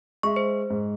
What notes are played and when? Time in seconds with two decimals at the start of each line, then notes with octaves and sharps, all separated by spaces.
0.23 G#3 E5 C#6
0.36 C5
0.70 G#2